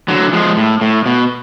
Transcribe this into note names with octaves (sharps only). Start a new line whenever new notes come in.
D3 F#3
F3 G#3
A2
A2
B2